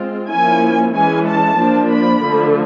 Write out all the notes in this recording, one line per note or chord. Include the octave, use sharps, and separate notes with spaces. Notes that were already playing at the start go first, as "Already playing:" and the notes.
Already playing: G#3 C4 F4
F3 A#3 C#4 E4 G#5
E3 G#3 C#4 G#5
A5
F3 A#3 D4
B5
D3 F3 A3